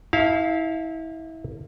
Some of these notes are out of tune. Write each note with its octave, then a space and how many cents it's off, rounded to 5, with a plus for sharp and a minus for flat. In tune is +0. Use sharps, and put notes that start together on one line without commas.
E4 -30 F5 +0 A5 -5